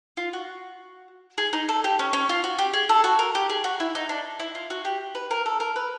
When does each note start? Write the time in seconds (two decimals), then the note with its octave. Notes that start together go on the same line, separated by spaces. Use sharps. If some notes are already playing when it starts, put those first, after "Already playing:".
0.17 F4
0.33 F#4
1.38 G#4
1.53 D#4
1.69 A4
1.84 G4
1.99 C#4
2.13 C#4
2.29 F4
2.44 F#4
2.58 G4
2.73 G#4
2.89 A4
3.04 F#4
3.19 A#4
3.35 G4
3.49 G#4
3.64 F#4
3.80 E4
3.95 D#4
4.09 D4
4.40 E4
4.55 F4
4.70 F#4
4.85 G4
5.15 B4
5.31 A#4
5.46 A4
5.60 A#4
5.76 B4